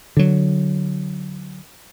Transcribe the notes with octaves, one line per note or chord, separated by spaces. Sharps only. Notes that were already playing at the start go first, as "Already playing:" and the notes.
D3 F#3